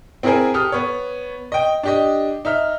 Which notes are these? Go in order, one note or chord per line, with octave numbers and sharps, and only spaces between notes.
C4 E4 G#4 A#4 C5 G#5
G4 A4 D#6 F6
B3 C#5
D#5 G5
D4 G4 D#5
D#4 E5 F6